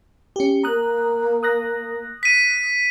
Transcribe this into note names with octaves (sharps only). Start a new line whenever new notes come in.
C#4 G4
A#3 A#5 D#6 F#6
D#6 F#6 A#6
B6 D#7